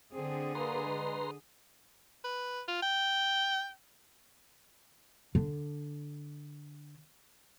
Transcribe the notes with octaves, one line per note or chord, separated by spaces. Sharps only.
D3 C4 G#4
A#3 B4 A#5 C6
G#3
B4
F4
G5
D3 D4